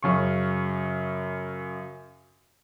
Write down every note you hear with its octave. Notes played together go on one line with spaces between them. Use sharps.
F#2 C#3 C#6